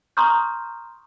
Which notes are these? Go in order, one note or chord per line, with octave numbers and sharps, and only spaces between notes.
A#5 C6 C#6 D#6 F6 G6